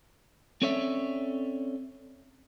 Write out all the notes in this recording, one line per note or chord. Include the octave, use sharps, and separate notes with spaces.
C4 C#4 A4 C#5 D5 E5